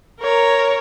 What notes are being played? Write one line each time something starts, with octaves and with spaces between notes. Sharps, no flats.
A#4 C#5